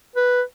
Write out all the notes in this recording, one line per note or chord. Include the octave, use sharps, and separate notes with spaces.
B4